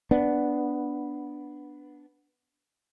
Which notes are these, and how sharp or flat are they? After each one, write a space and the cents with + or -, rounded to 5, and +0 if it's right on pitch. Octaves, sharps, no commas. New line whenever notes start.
B3 +0 D4 +0